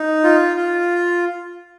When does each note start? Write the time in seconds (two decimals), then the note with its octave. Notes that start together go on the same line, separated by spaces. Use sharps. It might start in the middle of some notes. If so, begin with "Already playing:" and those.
Already playing: D#4
0.24 F4
0.57 F4